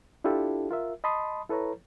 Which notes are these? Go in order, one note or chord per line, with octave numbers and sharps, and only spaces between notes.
D4 E4 F4 G4 A4
F4 A#4 E5
D#5 A5 B5 C6 D#6
E4 A4 B4 C#5 A#5